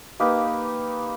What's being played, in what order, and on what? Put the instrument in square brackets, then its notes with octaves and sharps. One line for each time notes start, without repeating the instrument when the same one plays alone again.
[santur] A#3 D#4 G4 B4